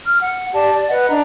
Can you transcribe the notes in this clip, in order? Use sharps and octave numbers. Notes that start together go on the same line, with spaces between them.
F6
F#5
G4 D5 A5
D5
B4 D#5 F#5
D4 A#5